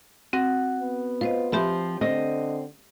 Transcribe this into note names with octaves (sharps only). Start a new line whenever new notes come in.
C4 F#4
B3
F4 B4 C5 D#5
F3 C4 G4 E5 B5
D3 C4 D#5